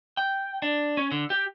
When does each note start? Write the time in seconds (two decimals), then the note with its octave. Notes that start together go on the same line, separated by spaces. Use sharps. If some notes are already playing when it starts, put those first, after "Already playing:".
0.17 G5
0.62 D4
0.97 C#4
1.11 D3
1.30 G4